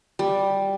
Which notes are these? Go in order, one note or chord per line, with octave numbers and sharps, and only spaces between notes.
G3